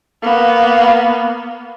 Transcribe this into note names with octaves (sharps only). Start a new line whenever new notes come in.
A#3 B3